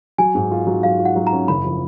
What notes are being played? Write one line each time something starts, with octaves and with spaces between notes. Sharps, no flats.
F#3 G#5
G#2
F4
F#3
F#3 F5
F4
F#5
F#3
A#5
C#4
F#1 B5
F3